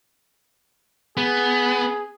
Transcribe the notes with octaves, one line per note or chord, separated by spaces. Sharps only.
B3 G#4